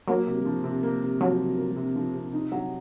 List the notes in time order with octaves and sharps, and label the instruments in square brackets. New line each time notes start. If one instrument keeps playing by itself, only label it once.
[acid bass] F#3 [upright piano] A#3
[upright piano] C3
F3
C3
A#3
C3
[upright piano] F3 [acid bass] F#3
[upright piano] C3
A#3
C3
F3
C3
D#4
F#3